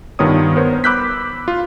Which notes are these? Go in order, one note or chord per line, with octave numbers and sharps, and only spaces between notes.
G2 D#3 B3 F4 C#5 D#6
B3 A#4 C5 C#5
B5 D6 E6 F#6 G6 B6
F4